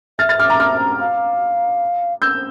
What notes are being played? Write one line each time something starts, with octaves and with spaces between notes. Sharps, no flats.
E5 F6 A6
F6 A6
D6 F6
A#5 D6
D6 F6
F5
E6 G6